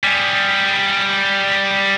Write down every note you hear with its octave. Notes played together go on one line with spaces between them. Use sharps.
G3 G#4